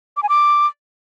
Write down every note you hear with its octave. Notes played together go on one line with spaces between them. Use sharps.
D6
G#5
D6